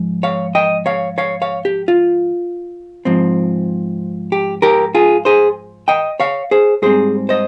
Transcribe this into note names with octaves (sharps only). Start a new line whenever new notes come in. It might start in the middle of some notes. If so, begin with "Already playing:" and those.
Already playing: G#2 F3
C#5 F5
D#5 G5
C#5 F5
C#5 F5
C#5 F5
G4
F4
G#2 F3 C4
G4
G4 A#4
F4 G#4
G#4 C5
D#5 G5
C#5 F5
G#4 C5
G#2 G3 C4 G#4 C5
C5 D#5